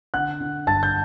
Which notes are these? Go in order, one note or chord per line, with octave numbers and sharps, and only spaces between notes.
D3 F#5 F#6
D3
G1 A5 A6
G6